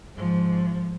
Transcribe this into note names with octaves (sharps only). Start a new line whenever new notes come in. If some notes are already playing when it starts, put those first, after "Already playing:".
G#2 F3